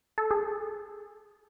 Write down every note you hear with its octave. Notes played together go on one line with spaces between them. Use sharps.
A4
G#4